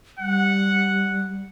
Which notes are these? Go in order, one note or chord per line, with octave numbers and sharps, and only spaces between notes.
G3 F#5